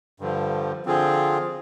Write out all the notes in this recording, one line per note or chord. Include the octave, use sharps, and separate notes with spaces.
G2 D3 F3
D3 F3 C4 F4 G#4